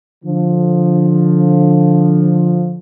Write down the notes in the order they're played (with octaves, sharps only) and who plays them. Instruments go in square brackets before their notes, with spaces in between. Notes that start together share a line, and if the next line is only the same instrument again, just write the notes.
[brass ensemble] D3 F3